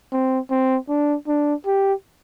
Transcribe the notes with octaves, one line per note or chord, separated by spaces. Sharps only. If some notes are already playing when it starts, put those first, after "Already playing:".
C4
C4
D4
D4
G4